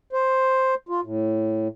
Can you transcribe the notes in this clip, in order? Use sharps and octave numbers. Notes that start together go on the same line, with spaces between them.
C5
F4
A2